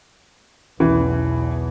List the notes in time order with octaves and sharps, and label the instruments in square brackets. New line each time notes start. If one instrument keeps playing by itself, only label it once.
[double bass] B1 E2 [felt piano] E3